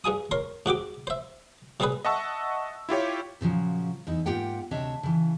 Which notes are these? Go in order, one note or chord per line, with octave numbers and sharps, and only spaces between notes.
G2 G#4 G#5 D#6
A#4 C#5 C6
G#2 F#4 G4 D6
C5 E5
C3 G3 C4 G#4 B4
D#5 E5 F#5 A5 C#6 E6
E4 F4 G4 C#5
A#2 C#3 F3 F#3
E2 D#4 E4
G#2 A#3 F4 G4 F#5 G5
D2 C3 D4 C#5 D#5 E5
C#3 E3